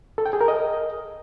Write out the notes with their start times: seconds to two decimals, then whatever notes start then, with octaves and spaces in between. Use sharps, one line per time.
0.18 A4
0.26 G5
0.33 G#4
0.41 A#4
0.48 D#5